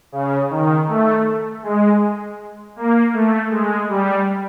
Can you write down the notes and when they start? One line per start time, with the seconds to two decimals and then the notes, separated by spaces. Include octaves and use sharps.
0.12 C#3
0.51 D#3
0.88 A3
1.63 G#3
2.76 A#3
3.13 A3
3.50 G#3
3.89 G3